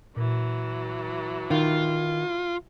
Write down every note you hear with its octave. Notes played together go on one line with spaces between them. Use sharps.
A#2 E3 F#3
D#3 F4